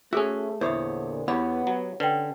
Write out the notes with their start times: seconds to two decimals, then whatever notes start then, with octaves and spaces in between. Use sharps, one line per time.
0.13 A3 C#4 F#4 G#4 A4 E5
0.61 E2 A#2 D3 C5 C#5 E5 D#6
1.28 E2 B3 G4 C#5 F#5 B5
1.67 F#3
2.00 D3 C#4 B4 G5